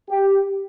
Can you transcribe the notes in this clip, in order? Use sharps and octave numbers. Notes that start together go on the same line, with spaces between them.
G4